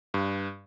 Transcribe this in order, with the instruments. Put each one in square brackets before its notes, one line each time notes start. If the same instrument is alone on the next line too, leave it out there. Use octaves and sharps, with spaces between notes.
[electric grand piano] G2